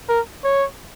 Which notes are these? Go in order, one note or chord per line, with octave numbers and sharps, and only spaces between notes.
A#4
C#5